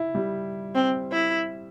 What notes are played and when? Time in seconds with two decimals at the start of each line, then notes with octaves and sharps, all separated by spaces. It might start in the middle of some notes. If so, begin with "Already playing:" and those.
Already playing: E4
0.15 G3
0.75 C4
1.12 E4